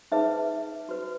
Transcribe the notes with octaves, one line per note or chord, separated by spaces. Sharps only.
D#4 G#4 B4 E5
F#4 B4